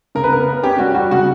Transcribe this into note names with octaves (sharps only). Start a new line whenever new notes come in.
C#3 A#4
B4
B3 A#4
B3
C#4 G4
G3 F#4
G3 F#4
C#3 F#4